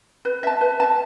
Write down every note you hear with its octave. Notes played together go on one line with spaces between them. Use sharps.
B4
E5 A5
B4
E5 A5